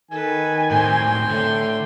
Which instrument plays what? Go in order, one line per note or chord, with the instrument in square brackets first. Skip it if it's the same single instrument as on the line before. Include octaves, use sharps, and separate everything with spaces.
[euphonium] D#3 [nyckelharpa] A4 B4 [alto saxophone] G#5
[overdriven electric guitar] A2 C4 [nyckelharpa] G5 C6
[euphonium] A2 [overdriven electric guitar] D3